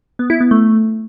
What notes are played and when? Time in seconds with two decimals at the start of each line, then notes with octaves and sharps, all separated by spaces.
0.19 B3
0.30 E4
0.41 B3
0.51 A3